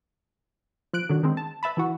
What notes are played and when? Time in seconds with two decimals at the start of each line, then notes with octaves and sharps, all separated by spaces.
0.93 F3 F#6 D7
1.09 D3 D#3 F#3
1.23 D#3 G#3 C4
1.37 A5
1.63 B4 E5 A5 B5
1.77 E3 E4 F#4